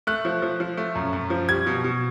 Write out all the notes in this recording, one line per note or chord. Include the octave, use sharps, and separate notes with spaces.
A3 F#6
F3
F3
F3
A3
F#2
F#2
F3
G3 G#6
B2
B2